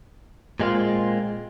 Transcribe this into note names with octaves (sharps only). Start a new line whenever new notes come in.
A#2 G#3 C4 F4